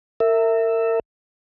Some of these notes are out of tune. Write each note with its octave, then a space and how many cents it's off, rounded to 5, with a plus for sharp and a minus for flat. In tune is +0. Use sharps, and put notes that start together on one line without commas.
A#4 -35 E5 +0